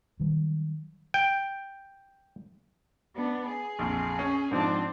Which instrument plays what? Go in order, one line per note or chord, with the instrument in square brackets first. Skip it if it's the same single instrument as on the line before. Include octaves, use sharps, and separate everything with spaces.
[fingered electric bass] D#3 F#3 G3
[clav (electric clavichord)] G5
[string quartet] B3 D4
G#4
[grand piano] A#1 F2
C#4 C#5
[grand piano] G#2 F3 [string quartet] C4 D4